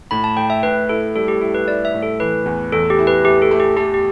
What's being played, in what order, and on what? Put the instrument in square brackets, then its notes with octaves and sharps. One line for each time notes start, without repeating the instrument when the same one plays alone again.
[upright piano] A2 [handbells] B5
[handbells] A5
[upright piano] A2 [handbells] G5
[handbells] E5
[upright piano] A2 [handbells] B4
[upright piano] E4 [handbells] A4
[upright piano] G3 [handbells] A4
[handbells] G4
[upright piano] E4 [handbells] A4
[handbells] B4
[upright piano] E4 [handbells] D5
[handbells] E5
[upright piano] A2
[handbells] A4
[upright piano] E3 [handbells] B4
[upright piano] E2
[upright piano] E2 [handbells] A4
[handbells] G4
[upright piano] E4
[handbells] B4
[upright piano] A3 [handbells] G4
[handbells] A4
[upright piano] A3
[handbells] G4
[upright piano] A3 [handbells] G4
[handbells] G4